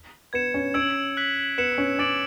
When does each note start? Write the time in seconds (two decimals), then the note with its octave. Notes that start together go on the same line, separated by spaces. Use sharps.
0.33 B3 G#6 C#7 E7
0.54 C#4
0.74 C#4 E6 G#6 D7 F#7
1.17 F#6 B6 F#7
1.58 B3 F#6 C#7 E7
1.78 C#4
1.99 C#4 D6 A6 D7 F#7